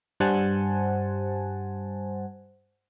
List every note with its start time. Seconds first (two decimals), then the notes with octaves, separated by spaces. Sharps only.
0.20 G2 G3 C5 F#5 G#5 A5